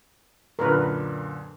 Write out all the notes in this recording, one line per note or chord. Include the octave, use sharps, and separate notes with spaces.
F#2 A#2 D3 A#4 B4